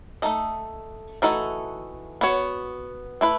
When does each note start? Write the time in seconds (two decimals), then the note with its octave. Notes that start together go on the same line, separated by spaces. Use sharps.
0.22 A3 D#4 A4 D#5
1.22 E3 A3 D#4 F#4 A4
2.21 B3 F#4 C#5
3.21 A3 E4 B4